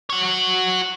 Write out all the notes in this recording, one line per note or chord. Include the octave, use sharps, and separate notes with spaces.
F#4 C#5